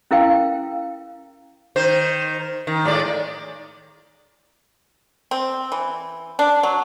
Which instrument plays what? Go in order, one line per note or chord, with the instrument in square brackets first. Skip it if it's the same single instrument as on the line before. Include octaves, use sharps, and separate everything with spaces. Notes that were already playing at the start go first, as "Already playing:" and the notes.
[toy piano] C#4 E4 A#4 F5 G5
[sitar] D#3 C5
D#3
A2 G#3 D5
[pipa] C4
E3
D4
F#3